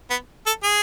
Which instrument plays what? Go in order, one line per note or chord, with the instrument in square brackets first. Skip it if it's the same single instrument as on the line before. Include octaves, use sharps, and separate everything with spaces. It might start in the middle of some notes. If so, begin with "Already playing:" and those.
[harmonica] B3
A4
G#4